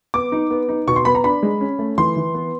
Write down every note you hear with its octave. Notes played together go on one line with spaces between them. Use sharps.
B3 D6
D#4
B3
D#4
B2 C#6
C6
B3 B5
A#5
D4 B5
G#3
C#4
A3
E3 C6
E3
B3